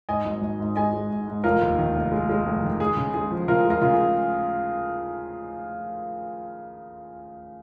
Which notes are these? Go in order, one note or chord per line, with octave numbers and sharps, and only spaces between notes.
G#2 D#5 G#5
G#1
G#1
G#2
G#3 D#5 G#5
G#3
G#2
G#2
F1 F4 A#4
D#2
D#3
F1
G#3
G#3
F1
D#3
G#3 G#4
C#3
G#3 G#4
F3
C#3 F4 A#4
G#3
F4 A#4
C#3 F4
G#4